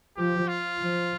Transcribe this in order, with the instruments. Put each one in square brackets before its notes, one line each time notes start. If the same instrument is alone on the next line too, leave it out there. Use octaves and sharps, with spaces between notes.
[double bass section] F3 [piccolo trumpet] G4
[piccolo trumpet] F4
[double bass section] F3